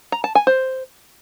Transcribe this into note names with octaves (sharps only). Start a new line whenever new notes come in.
A#5
A5
G#5
C5